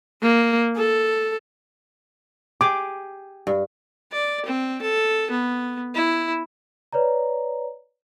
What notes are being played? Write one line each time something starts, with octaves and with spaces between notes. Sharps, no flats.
A#3
A4
G4 G#4 D6
G2
D5
C4
A4
B3
E4
B4 C#5 D5 A#5